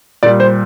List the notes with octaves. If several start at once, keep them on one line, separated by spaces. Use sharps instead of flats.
A#2 G3 D5
C5